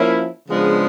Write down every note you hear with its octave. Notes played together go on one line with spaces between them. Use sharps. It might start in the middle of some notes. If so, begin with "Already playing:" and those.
Already playing: F3 A#3 C#4 E4
C#3 F3 G#3 B3 D4